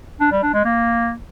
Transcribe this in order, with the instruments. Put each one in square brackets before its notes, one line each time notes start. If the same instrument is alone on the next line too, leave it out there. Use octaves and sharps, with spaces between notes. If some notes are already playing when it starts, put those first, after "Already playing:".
[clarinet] D4
G3
D4
G#3
A#3